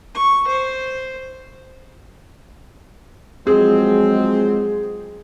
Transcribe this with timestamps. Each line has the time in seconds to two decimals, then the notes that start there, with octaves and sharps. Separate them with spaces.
0.15 C#6
0.48 C5
3.47 F3 F#3 G#3 C4 G#4